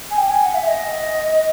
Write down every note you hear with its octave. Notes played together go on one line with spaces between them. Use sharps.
G#5
G5
G#5
F#5
E5
D#5